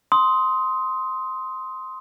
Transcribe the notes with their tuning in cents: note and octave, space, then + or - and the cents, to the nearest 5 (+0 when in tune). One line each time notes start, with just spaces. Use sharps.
C6 +0 D#6 +20